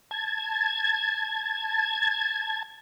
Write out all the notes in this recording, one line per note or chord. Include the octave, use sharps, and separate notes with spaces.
A5 G#6